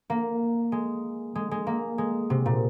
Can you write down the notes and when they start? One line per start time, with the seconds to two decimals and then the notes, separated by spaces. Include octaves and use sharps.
0.10 A#3
0.72 G#3
1.35 G#3
1.51 G#3
1.67 A#3
1.98 G#3
2.30 C3
2.46 A#2